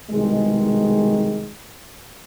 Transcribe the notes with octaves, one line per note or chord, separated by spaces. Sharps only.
C2 B2 D#3 G#3